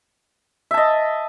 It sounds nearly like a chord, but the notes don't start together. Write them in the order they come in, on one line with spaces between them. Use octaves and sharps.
E5 A5 D#5